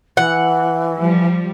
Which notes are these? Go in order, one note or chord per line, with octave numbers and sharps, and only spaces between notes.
E3 F#5
F3 G3